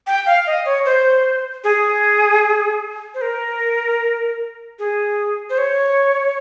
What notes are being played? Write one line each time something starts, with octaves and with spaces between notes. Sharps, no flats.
G5
F5
D#5
C#5
C5
G#4
C5
A#4
G#4
C5
C#5